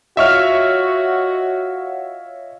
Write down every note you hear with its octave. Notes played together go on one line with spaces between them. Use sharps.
F4 F#4 C#5 D#5 E5 C#6 F6